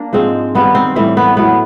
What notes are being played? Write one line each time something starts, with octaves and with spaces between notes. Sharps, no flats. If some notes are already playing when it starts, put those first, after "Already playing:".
Already playing: A#3 D4
G#2 F3 G#3 C4
G2 D#3 G3 A#3 B3
C4
A2 E3 G3 C4
B3
A2 F#3 A3 B3